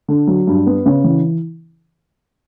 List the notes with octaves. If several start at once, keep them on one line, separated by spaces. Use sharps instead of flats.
D3
F#3
G2
B3
C#3
E3